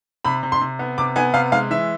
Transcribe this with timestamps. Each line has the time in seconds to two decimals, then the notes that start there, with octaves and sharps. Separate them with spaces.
0.25 C3 B5
0.43 C3
0.52 C6
0.61 C3
0.79 B3
0.98 C3 D6
1.16 B3 G#5
1.34 C3 F5
1.52 G#3 F5
1.70 E3 E5